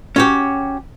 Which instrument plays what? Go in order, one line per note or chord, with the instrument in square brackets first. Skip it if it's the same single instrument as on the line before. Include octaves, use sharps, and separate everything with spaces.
[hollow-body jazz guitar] C#4 F#4 G4